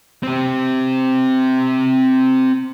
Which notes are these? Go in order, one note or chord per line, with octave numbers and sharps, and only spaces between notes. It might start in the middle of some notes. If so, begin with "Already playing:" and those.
C4 G4